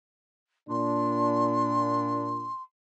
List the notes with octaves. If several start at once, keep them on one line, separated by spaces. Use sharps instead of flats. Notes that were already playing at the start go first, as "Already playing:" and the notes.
A#2 D4 C6